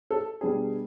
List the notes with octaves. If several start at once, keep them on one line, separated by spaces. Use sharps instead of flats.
A4
B2 G3 B3 D4 G#4